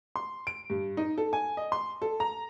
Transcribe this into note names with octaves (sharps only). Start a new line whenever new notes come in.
C6
D7
G2
D#4
A4
G#5
D#5
C6
A4
A#5